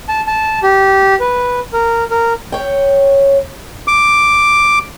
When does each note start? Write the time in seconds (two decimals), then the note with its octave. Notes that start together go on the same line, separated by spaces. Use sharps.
0.08 A5
0.27 A5
0.63 G4
1.20 B4
1.73 A#4
2.11 A#4
2.52 C#5 G5
3.88 D6